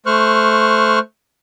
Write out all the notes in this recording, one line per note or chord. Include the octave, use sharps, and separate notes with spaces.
A3 C5 C#6 F6 F#6